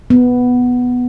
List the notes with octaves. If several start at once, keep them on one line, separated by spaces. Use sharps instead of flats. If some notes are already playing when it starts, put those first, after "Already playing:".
B3